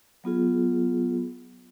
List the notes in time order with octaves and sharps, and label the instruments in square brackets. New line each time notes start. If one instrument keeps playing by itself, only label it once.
[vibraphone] F#3 B3 F4 G#4